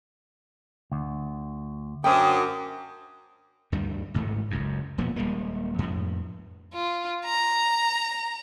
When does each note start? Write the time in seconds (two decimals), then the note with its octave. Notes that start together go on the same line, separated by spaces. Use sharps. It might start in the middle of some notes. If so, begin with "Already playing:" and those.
0.92 D2
2.04 F#2 D4 C5 G5 D6 D#6
3.72 D2 G2 D#3 G3
4.14 A1 G#2 D#3 A3
4.51 F#1 C#2 F#2
4.98 E1 A#2 F3 B3
5.16 D#1 G3 G#3 A#3
5.79 F2 A2
6.74 F4
7.25 A#5